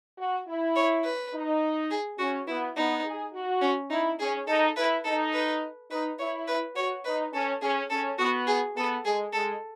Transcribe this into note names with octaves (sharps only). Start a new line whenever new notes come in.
F#4
E4
C#5
B4
D#4
G#4
C#4 F#4
B3 E4
B3 D#4
G#4
F#4
C#4
D#4 E4
C#4 G#4
D#4 A4
E4 B4
D#4 A4
B4
D#4 B4
E4 C#5
B4
F#4 C#5
D#4 B4
C#4 A4
C#4 G#4
C#4 A4
B3 F#4
G#4
B3 A4
G#3 G#4
G#3 A4